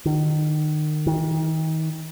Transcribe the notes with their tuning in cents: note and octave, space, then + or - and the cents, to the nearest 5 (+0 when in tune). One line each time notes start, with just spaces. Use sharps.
D#3 -30
D#3 +35